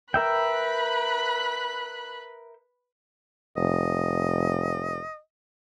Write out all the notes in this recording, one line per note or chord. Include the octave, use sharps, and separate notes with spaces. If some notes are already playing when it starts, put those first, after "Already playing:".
A#4 B4 E5 G5 B5 F#6
F1 D#5